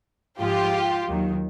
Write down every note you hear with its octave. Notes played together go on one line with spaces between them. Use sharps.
G#2 F3 G#3 F4 G4
D#2 D#3 F#3